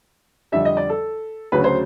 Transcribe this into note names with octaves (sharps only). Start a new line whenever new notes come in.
F2 D3 G3 E5
D#5
D5
A4
D2 C#3 F#3 B4
C5